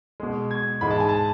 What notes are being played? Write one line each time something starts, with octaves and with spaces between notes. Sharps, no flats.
B2 G#3
G#6
G#2 E3 G#3 B5
A5
G#5
A5